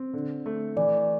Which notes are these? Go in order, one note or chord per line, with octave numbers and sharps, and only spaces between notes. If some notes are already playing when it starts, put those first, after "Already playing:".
Already playing: C4
D3
A3
E3 D5